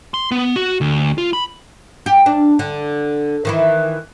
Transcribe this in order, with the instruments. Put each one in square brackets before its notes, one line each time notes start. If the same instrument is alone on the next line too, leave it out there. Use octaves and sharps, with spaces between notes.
[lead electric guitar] C6
B3
F#4
D2
F4
B5
[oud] G4
D4
D3
D#3 E3 E4